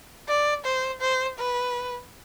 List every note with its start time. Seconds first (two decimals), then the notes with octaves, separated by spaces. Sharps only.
0.28 D5
0.65 C5
1.01 C5
1.38 B4